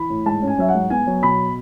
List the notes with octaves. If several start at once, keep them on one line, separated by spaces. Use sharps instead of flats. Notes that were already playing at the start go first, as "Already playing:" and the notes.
Already playing: E3 B5
A2
G#2 A5
C#4
G#5
F#3 E5
F#5
G#2
B3 G#5
F#3
B2 B5